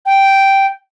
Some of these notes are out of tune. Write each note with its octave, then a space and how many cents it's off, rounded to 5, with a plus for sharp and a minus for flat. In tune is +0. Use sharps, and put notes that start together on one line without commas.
G5 -5